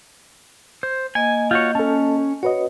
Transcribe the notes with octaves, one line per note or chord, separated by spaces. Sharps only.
C5
A#3 D#5 G#5
F4 F#4 C#5 G6
C#4 A4 A5
F#4 B4 C#5 D#5